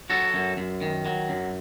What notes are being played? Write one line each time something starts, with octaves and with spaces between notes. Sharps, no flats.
F#3 F#4 A4
F#2
F#2
D#3
F#3
F#2